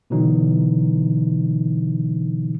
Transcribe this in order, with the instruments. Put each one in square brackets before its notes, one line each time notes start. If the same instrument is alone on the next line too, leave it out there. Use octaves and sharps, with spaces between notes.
[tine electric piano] B2 D3 E3 F#3 D#4